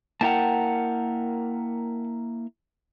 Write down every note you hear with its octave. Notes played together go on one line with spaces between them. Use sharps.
A#3 E4 A#4 F#5 G5 A5